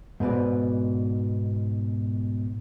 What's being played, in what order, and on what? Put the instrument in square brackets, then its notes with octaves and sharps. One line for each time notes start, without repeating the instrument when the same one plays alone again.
[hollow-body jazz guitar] G#2 B2 B4 D5